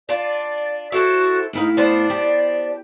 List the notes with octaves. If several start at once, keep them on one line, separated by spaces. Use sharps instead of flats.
D4 F4 D5
E4 F#4 A4 C5
A2 D#4 E4 F5
B3 D4 C5 D5
G4